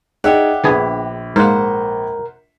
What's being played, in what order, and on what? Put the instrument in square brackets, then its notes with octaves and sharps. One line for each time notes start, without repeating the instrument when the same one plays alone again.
[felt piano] D#4 G#4 D5 [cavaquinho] G4 E5 F#5
[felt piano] A#1 B5 [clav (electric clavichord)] D3 B3 G#4
[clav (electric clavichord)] G#2 A#3 [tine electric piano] A#4 [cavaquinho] C5 F#5